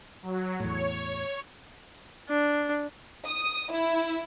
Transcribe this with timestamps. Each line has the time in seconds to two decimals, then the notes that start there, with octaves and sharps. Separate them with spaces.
0.22 F#3
0.60 E2 A2 C#5
2.29 D4
3.24 D#6
3.72 E4